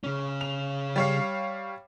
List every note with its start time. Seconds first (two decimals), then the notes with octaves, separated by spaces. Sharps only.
0.04 C#3 C#4
0.41 F7
0.96 G3 C#5 F5